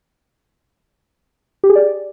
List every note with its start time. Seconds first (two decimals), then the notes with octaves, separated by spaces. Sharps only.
1.64 G4
1.69 G#4
1.75 D5